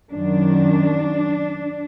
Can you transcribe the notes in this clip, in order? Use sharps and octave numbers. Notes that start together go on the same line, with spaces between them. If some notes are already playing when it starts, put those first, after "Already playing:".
F#2 D#3 F#3 D4